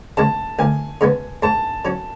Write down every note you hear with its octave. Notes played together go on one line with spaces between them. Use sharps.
C#3 G#3 A5
D2 G#5
C#3 G#3 B3
G#2 A5
F#3 C#4